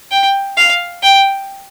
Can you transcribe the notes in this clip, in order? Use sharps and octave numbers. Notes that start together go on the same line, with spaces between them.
G5
F5
G5